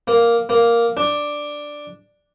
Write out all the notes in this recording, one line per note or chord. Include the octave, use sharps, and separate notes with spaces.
A#3
A#3
D4